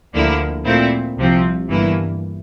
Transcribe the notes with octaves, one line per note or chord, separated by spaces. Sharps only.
D2 D3 F3 A#3 E4
A#2 A3 C4 E4
C2 C3 F3 C4
G1 G2 E3 A#3 E4